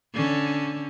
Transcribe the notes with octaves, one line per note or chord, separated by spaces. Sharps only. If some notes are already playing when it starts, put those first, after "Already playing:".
D3 C#4